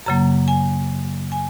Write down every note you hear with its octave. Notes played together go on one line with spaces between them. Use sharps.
F#2 C#3 F#3 A#3 A#5
G#5
G#5